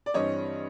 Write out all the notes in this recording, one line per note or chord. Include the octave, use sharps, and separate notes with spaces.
D5
G2 E3 G3 C4 C#5 D#5